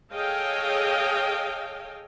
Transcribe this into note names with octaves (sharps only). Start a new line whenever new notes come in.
G#4 A4 C#5 D#5 F5 G5